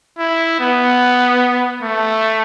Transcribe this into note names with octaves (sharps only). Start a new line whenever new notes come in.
E4
B3
A3